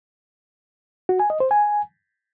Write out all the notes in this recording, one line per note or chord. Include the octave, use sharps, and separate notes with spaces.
F#4
G#5
D#5
C5
G#5